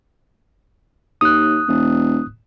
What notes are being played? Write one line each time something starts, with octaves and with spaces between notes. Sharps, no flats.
D#2 D#6 F#6
E1